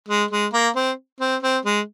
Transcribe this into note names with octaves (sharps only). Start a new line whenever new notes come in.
G#3
G#3
A#3
C4
C4
C4
G#3